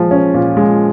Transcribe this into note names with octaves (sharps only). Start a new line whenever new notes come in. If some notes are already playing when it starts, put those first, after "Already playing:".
Already playing: A#2 F3 G#3
C#4
A#2
G#3